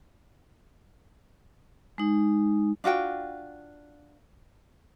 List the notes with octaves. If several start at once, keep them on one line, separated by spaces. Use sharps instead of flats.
G#3 D#4
D4 F4 F#4 G5